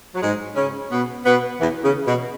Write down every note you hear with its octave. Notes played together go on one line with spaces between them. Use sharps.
F#3
G#2 G#3
C#3 C#4
B2 B3
B2 B3
E2 E3
C#3
B2